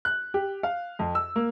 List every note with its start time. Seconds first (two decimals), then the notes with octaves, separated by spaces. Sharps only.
0.05 F#6
0.34 G4
0.63 F5
0.99 F2
1.15 E6
1.36 A#3